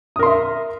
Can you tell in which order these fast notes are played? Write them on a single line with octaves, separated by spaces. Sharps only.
D#6 A#4 C6 E5